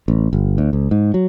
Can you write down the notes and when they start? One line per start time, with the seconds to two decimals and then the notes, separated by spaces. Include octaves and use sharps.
0.08 A1
0.33 G1
0.58 D2
0.73 C#2
0.91 G#2
1.14 F#3